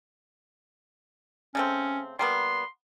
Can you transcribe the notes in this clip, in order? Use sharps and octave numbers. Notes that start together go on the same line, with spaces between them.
C#3 A3 C4 C#4
G3 A#3 B3 C6